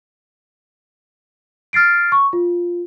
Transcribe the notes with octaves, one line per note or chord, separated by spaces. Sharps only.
F6 A6 C7 D7
C#6
F4